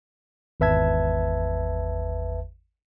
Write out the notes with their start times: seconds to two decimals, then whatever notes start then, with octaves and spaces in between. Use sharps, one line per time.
0.60 G#1 E2 B4 E5 A5 G#6